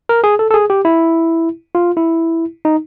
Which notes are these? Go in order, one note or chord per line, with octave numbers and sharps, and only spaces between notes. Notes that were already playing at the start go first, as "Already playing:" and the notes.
A#4
G#4
A4
A4
G#4
G4
E4
F4
E4
D#4